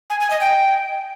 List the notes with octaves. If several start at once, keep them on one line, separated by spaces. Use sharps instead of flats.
G#5
G#5
D#5
G5